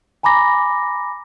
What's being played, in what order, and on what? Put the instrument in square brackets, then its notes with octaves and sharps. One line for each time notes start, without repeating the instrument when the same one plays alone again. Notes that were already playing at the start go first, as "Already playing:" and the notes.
[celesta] G#5 A#5 B5 D6 A#6